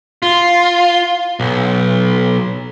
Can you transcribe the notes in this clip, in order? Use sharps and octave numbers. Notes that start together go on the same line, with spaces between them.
F4
B1